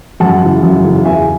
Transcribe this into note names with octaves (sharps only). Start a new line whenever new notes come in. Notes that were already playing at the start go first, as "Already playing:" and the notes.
F#2 F#5 A5
C#3 E3
F#2
C#3 E3
E2 E5 G#5